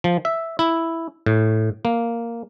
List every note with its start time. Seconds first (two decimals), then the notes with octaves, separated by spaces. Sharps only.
0.04 F3
0.25 E5
0.59 E4
1.26 A2
1.85 A#3